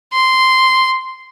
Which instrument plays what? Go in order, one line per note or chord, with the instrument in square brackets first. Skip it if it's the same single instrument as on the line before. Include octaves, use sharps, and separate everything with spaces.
[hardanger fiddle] C6